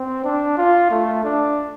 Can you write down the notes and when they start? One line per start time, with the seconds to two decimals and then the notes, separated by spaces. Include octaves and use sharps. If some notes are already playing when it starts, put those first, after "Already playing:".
Already playing: C4
0.24 D4
0.57 F4
0.91 A3
1.24 D4